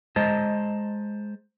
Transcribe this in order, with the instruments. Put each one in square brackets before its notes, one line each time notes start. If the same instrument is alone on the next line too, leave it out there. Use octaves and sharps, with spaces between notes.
[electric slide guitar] G#3 C5 D#5 A5 A#5